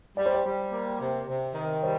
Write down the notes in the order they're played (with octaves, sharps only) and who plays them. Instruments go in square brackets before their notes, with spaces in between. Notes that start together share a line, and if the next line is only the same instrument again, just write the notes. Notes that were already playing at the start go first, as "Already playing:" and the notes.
[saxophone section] G3 [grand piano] D5
[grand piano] C5
D5
[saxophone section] G3
A#3
C3
C3
D#3
[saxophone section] G3 [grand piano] C5